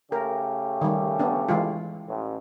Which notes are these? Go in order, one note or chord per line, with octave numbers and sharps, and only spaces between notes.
C#3 A3 G4 A#4
D#3 G3
B3 D4
E3 G#3 F4
A1